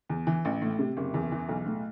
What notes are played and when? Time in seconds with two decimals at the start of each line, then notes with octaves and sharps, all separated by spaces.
0.10 E2
0.27 E3
0.45 A1
0.62 A2
0.79 C3
0.97 F#1
1.14 E2
1.32 E3
1.49 B1
1.66 A2